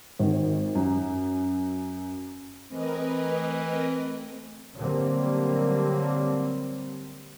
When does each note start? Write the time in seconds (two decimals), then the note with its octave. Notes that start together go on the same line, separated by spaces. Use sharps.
0.19 G#1
0.75 F#2
2.70 E3 A3 C4 A#4 B4 D#5
4.77 D3 F#3 G3 A#3 C4